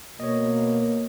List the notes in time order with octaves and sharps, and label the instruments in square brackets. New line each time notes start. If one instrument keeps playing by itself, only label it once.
[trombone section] B2 [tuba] A#3 [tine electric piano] C#5 D#5